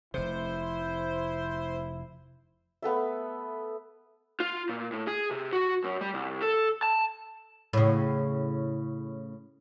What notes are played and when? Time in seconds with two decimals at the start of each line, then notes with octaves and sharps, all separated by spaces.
0.14 F1 C3 E4 C5
2.82 A3 B3 A4 E5
4.40 F4
4.69 A#2
4.92 A2
5.08 G#4
5.31 C3
5.53 F#4
5.84 F#2
6.01 G3
6.14 C2
6.42 A4
6.83 A5
7.73 A2 C#3